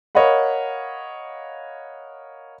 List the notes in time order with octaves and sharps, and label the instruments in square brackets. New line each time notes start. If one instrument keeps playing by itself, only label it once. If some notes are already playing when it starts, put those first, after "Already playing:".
[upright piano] A#4 C#5 D#5 F5 F#5 B5